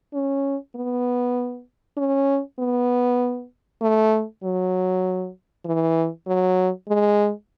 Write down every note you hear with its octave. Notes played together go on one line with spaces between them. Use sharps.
C#4
B3
C#4
B3
A3
F#3
E3
F#3
G#3